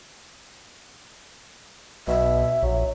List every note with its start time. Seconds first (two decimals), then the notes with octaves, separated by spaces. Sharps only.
2.08 B1 B2 E5
2.62 A#1 F#3